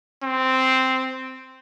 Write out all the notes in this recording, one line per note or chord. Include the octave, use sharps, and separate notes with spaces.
C4